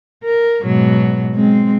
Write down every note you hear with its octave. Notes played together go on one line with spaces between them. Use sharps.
A#4
G#2 B2 F#3
G#3 C4